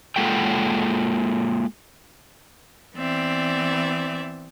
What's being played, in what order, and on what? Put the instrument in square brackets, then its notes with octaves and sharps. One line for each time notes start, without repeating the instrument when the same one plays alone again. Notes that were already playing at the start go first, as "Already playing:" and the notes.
[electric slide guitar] G#3 A#3 F4 A4 F#5 G5
[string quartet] E3 B3 C4 D5 E5